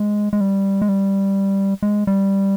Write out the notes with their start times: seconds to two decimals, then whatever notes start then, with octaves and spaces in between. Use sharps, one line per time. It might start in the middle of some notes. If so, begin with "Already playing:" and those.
Already playing: G#3
0.33 G#3
0.41 G3
0.82 G#3
0.89 G3
1.83 G#3
2.07 G3